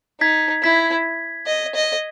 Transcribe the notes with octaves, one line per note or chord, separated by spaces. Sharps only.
D#4 G#6 B6
E4 G#6 B6
D#5
D#5